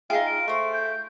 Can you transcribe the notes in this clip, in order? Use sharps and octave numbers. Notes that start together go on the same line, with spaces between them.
D#4 F4 G#4 E5 F5 G5
D7
A3 C5 C#6
G6